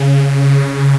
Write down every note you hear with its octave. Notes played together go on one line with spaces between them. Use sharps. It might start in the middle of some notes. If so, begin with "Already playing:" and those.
Already playing: C#3